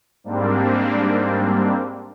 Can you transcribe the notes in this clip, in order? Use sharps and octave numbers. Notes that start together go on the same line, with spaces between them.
G#2 G3 A#3 C4 D4